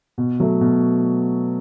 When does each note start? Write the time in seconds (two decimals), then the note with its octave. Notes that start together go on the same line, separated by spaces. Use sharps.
0.18 B2
0.40 F#3 A3
0.61 B2